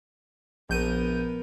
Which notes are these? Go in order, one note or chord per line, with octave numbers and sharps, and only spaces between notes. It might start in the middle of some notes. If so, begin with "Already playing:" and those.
A#1 B3 A#4 G6 D#7